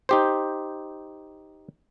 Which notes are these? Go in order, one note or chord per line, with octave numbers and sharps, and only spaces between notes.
D#4 G4 C5